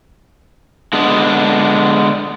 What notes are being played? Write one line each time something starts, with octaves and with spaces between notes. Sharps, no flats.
D3 G#3 B3 D4